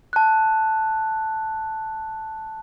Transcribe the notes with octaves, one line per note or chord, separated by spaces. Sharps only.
A5 F#6